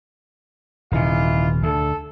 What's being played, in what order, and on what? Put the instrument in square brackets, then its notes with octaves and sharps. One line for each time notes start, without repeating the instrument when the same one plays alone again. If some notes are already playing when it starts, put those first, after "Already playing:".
[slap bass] D#1 C3 [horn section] E3 D#4 F4
[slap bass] D2 [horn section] A4